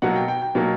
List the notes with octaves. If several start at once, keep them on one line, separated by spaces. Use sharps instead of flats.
B2 F#3 A#3 F#5
G5
G5
G5
B2 F#3 A#3